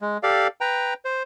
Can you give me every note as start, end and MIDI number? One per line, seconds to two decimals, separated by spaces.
0.01 0.18 56
0.23 0.48 67
0.23 0.48 69
0.23 0.48 74
0.23 0.48 77
0.61 0.94 71
0.61 0.94 79
0.61 0.94 82
1.05 1.23 72